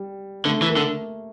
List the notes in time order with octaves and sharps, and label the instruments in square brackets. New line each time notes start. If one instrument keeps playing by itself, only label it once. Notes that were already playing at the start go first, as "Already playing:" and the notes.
Already playing: [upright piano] G3
[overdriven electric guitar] D3 [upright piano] A3
[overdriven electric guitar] E3
[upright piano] A#3
[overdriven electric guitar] D3